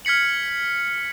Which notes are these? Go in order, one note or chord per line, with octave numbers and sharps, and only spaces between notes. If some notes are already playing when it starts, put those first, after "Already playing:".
F6 G#6 B6 C#7 F#7